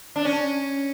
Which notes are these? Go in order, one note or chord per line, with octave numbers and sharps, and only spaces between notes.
D4
C#4